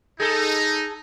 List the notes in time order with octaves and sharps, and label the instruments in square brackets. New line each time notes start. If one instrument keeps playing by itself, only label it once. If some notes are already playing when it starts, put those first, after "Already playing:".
[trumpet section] D#4 [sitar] G#4 A4